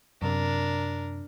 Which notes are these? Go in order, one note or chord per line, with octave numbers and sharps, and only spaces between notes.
F#2 C3 D4 A#4